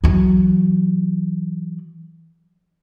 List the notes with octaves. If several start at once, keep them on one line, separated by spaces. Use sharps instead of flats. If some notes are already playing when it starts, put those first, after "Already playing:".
E3 F#3